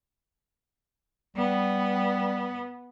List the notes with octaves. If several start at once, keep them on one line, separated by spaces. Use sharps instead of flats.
G3 B3